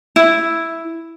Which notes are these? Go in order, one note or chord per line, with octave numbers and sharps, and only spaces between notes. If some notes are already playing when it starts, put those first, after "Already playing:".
E4